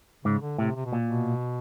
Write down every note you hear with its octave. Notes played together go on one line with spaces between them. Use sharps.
G#2 C#3
D3
A2 C3
C3
B2
A#2
B2